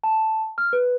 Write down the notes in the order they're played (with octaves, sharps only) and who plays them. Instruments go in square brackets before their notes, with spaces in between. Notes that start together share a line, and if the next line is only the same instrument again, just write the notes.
[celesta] A5
F6
B4